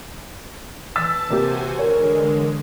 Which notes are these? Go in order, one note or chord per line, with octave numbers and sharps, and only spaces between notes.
E3 A5 E6 A6 B6
C3 A#3 F#4 G4 C5 G#5
D3 G#3 A#4 C#5